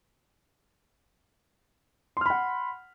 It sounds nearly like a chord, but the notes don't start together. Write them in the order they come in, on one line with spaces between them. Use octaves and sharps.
C6 F6 B5 F#5